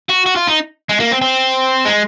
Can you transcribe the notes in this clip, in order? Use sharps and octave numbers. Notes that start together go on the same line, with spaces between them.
F#4
F#4
F4
D#4
G#3
A#3
C4
C4
G#3